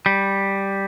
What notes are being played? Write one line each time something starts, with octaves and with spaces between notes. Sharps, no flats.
G3